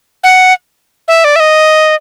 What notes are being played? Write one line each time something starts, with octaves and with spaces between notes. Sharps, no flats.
F#5
E5
D5
E5
D#5